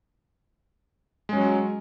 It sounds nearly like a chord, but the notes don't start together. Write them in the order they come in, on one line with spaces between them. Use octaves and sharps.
G#3 C#4 F#3